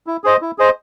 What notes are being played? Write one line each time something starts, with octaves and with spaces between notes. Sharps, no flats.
E4
G#4 C5 D#5
E4
G#4 C5 D#5